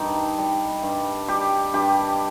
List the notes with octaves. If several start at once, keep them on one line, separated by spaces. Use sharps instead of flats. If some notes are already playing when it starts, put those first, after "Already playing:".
Already playing: G2 D#4
G3
G2
G3 G4
G2 G4